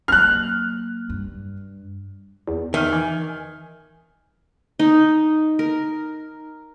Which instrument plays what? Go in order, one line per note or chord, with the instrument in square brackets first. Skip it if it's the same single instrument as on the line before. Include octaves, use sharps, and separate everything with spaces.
[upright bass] F#3 A#3 [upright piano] F6 F#6
[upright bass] G2
[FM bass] E2
[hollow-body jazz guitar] D#3 [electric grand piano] E5 F6
[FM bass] E3 [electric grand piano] G#5
[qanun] D#4
A#4